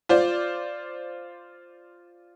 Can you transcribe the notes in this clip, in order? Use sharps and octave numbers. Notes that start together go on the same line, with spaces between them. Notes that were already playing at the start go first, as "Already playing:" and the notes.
F4 C5 D5